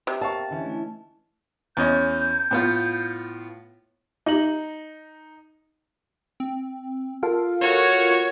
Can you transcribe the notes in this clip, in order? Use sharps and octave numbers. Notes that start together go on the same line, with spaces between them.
C3
A#4 F5 G5 A5 C#6
D3 E3 C#4 D#5 E5
A3 E4
E2 C#4 D#5 G6
A2 B3 F4
D#4 F#7
C4
F4 A4 A#4 F5
F#4 C#5 F6